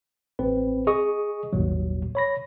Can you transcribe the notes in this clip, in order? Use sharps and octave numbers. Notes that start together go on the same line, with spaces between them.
A1 C4 B4
G#4 D#5 C#6 D#6
G#1 D#2 A#2 F#3
C#5 B5 A#6